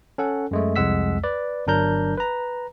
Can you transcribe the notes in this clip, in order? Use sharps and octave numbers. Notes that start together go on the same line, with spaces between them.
C#4 A4 F#5
F#2 G#3 A3
C2 F2 G#3 F#5 E6 B6
B4 D5
G1 F#3 D4 A#4 A#5 G6
B4 A#5